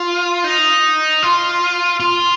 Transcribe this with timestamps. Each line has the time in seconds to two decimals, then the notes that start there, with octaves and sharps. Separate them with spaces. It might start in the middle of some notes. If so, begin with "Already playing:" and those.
Already playing: F4
0.44 D#4
1.22 F4
2.00 F4